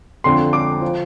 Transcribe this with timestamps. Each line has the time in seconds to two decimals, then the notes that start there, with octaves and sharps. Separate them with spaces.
0.24 F2 D3 F3 C6
0.53 D6
0.82 F3